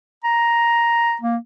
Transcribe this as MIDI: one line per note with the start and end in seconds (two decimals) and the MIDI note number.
0.24 1.16 82
1.22 1.37 58